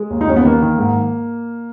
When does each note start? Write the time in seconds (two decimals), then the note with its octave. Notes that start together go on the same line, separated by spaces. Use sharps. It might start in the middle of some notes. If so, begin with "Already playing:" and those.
Already playing: G#3
0.10 D#2
0.21 D#4
0.27 D#2 C#4
0.36 B3
0.45 D#3 A#3
0.62 D#3
0.78 G#2